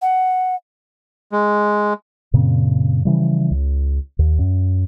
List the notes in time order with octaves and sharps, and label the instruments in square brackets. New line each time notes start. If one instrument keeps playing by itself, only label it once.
[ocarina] F#5
[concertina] G#3
[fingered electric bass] F#2 A#2 C#3 C4
C#3 E3 F3 G3
C#2
D#2
F#2